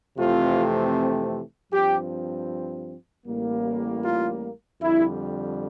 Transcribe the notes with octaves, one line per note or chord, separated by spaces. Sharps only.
F2 C3 E3 A3 C4 F4
G2 F3 C4 G4
A1 A2 G3 A#3
F4
F2 D3 G3 E4